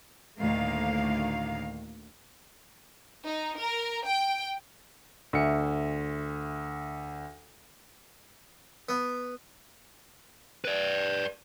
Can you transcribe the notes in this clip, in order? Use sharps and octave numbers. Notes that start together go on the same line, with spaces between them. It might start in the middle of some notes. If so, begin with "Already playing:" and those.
D2 A2 D#3 A#3 F5
D#4
A#4
G5
D2 E5 C#7
B3
B4 D5